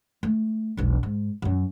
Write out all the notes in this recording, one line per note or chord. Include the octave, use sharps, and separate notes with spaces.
A3
E1 B1
G#2
F#2 F#3